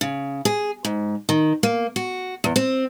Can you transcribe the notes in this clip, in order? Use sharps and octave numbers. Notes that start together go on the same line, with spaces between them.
C#3
G#4
G#2
D#3
A#3
F#4
E2
C4